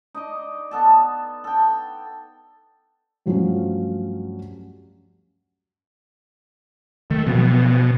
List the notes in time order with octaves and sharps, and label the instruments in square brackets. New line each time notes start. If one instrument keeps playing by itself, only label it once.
[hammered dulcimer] D#4 D5 D#5
B3 A4 A5
A4 G5
[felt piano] G2 F3 F#3 A3 C#4 F4
[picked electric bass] D#3 [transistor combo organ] A3
[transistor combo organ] B2 [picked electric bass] F3 F#3 B3